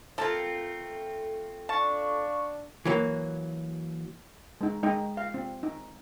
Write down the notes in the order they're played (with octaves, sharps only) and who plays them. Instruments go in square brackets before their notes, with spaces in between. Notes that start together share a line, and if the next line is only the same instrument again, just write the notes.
[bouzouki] A3 C4 F4 [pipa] A#3 A5
[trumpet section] D4 [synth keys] F5 C#6 [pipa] A5
[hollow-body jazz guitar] E3 F#3 A#3
[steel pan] G#3 D#4
G#3 D#4 D#5 G5
F5
C4
D#4